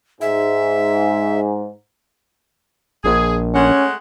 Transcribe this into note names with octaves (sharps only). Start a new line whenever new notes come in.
G#2 E5
A#1 G#4
G#3 A3 C#4 F#5